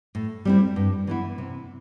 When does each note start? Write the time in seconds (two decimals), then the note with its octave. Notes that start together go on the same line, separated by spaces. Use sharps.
0.15 A2
0.45 G3 C4 E4
0.76 G2
1.07 E3 B3 E4
1.38 C3